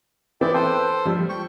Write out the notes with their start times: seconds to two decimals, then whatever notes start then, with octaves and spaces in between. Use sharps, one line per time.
0.41 E3 B3 C4 E4 D5 G5
0.54 A4 B4 C5 G5 A5
1.05 F3 G3
1.29 G5 C#6